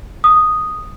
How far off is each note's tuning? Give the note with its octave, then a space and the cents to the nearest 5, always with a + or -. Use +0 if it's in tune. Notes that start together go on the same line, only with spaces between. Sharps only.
D#6 -5